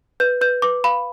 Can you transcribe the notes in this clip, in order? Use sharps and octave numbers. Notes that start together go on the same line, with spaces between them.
B4 G6
B4 G6
B4 D6
F5 B5